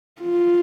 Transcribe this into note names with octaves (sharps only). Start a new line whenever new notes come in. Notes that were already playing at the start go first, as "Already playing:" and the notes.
F4